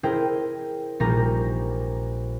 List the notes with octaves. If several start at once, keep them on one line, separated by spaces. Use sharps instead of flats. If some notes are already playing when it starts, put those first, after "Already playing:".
E4 G#4 A#4 C5 D#5 G5
A#1 G3 D#4 A#4 A#5 G6